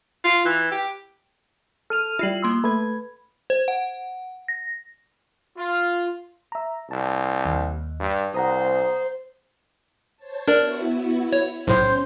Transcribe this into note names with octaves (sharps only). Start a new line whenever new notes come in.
F4
E3
G4
A4 F6 D#7 F7
G3 E4 F4 C7 F#7
A#3 C6 E6
A3 B4 B5 G#6
C5
F#5
A#6
F4
E5 A#5
C2 A5
D#2
G2
C2 C5 F#5 A#5 D#6
C5 C#5 A5
B3 D4 E4 F#4 A#4 D5
C#5
B1 A2 C#4 C5 G6